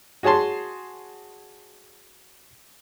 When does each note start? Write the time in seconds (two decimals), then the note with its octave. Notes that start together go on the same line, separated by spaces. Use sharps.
0.23 F#4 G#4 C#5 A5 C6